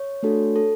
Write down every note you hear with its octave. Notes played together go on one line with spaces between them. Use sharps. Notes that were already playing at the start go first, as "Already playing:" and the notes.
Already playing: C#5
A3 D4 F#4 A4
A4